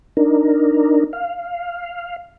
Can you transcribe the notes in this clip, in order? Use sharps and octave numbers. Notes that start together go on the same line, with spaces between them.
D4 D#4 A#4
F5